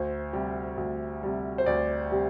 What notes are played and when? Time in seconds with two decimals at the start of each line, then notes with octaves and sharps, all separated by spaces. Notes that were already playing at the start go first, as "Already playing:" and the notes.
Already playing: D2 C5
0.33 C3 G3
0.77 D2
1.23 C3 G3
1.58 C5
1.66 D2 D5
2.11 C3 G3